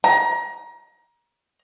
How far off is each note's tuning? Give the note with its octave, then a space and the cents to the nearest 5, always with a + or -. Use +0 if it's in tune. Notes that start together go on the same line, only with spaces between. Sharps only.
A#5 +25